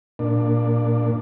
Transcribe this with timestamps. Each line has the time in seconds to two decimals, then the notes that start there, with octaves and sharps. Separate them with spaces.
0.19 A#2 D4